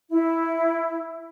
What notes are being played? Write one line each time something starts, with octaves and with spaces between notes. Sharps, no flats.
E4